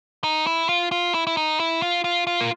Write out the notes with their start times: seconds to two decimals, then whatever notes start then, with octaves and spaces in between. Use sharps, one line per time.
0.24 D#4
0.47 E4
0.69 F4
0.91 F4
1.14 E4
1.27 E4
1.37 D#4
1.60 E4
1.82 F4
2.04 F4
2.27 F4
2.41 A#3